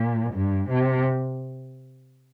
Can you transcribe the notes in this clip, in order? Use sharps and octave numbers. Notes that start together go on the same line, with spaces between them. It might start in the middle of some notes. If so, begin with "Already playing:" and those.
Already playing: A#2
G2
C3